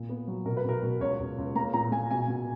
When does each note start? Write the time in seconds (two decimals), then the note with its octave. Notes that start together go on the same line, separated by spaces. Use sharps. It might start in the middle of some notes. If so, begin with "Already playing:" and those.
Already playing: A#2
0.09 B3
0.27 F#3
0.45 B2 A#4
0.57 B4
0.64 B2 A#4
0.83 B2
1.00 C#2 C#5
1.20 C#2
1.38 C#2
1.55 A#3 A#5
1.73 A#2 A#5
1.92 A#3 G#5
2.11 B2 G#5
2.28 B2